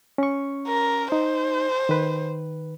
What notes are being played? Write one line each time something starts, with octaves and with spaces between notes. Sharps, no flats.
C#4 C#6
A#4
D#4 C5
D#3 B4